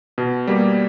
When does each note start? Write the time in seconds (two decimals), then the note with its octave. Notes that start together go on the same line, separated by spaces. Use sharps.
0.18 B2
0.47 G3 A#3